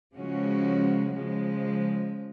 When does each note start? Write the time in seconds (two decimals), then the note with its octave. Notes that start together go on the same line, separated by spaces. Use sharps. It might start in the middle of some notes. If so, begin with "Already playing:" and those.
0.16 C#3 F3 G#3 C#4 F#4
1.16 C#3 F3 G#3